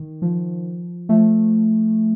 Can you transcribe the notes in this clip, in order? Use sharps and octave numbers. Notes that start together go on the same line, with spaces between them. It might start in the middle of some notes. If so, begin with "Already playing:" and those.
Already playing: D#3
F3
F3 A3